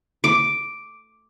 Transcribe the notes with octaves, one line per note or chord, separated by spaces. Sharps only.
D6